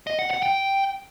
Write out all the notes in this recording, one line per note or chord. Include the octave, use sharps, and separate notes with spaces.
D#5
F#5
F#5
G5